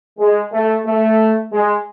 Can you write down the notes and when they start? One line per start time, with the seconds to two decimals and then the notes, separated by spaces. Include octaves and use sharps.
0.18 G#3
0.53 A3
0.86 A3
1.53 G#3